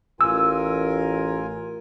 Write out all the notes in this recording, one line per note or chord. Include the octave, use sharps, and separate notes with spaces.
A1 F4 A#4 G#5 E6